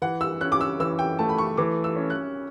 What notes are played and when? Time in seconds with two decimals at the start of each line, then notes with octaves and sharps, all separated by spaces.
0.02 E3 F#5
0.21 E6
0.41 C#4 F#6
0.52 D6
0.61 E6
0.80 E3 E6
0.99 G5
1.19 A3 A5
1.29 B5
1.38 C#6
1.57 E3 D6
1.84 E6
1.96 C#4
2.10 F#6